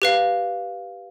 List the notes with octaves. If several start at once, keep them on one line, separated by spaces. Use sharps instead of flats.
G4 B4 F5